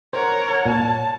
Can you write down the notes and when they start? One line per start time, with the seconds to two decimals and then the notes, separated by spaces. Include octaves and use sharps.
0.13 A#4 C5 C#5 F#5
0.66 A#2 A5